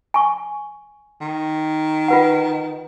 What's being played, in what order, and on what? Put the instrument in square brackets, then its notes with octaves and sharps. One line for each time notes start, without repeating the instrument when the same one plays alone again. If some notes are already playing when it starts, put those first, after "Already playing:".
[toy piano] G#5 C#6
[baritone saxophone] D#3
[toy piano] F4 B4 F#5